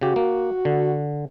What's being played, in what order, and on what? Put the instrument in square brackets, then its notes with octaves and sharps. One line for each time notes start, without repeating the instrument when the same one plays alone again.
[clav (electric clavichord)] C#3 G4 [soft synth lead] F#4
[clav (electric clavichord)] A#3
D3